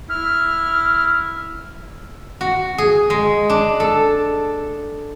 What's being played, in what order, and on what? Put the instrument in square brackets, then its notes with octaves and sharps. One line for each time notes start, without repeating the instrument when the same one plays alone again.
[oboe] E4 [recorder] F6
[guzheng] F#4
G#4
G#3
D4
A4